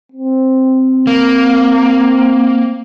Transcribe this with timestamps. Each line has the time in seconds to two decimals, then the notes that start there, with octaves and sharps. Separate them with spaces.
0.12 C4
1.07 A#3